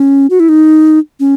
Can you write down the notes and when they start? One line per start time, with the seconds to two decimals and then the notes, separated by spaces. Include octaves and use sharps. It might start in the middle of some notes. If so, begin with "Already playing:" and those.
Already playing: C#4
0.30 F#4
0.40 E4
0.49 D#4
1.20 C#4